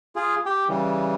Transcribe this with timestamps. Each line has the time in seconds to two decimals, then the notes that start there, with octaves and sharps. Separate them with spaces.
0.16 F4 G#4
0.46 G4 G5
0.69 C#3 E3 G3